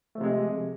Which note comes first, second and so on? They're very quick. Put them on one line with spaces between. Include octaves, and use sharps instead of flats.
A3 F3 C3 G#3